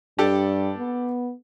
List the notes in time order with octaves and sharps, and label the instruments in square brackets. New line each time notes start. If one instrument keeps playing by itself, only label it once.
[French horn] G2 [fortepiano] D4 G4 A4
[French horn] B3